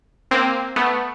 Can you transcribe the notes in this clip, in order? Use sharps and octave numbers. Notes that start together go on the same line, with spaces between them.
A#3 C4
A3 B3